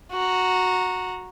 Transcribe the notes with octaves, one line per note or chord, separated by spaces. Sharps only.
F#4 A#5